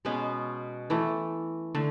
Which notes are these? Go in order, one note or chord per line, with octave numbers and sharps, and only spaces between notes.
B2 G#3 B3 C#4
E3 A3
D3 A3